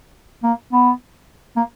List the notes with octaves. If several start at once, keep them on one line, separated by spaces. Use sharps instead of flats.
A#3
B3
A#3